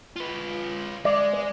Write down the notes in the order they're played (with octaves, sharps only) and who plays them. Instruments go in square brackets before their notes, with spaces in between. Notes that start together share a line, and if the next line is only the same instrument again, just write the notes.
[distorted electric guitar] F4 B4
[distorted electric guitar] G#3 [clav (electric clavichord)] D5